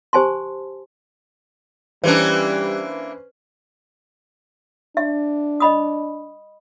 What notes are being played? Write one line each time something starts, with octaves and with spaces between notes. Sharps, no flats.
G4 C5 G#5 A5 C6
E3 G3 A#3 C#4 D4 B4 C5
D4 E5
D#5 B5 D#6